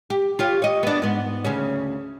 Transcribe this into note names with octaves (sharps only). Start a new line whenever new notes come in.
G4
F4 G4 C#5
C#5 D#5
B3 D4
G#2 B3
D2 C#3 C#4